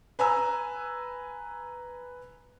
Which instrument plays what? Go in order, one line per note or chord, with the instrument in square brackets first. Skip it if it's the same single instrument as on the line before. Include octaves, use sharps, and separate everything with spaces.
[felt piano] B4 G#5 A#5 E6